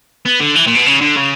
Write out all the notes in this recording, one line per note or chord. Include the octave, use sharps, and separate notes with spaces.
B3
D3
E3
A#2
B2
C#3
D3
C#3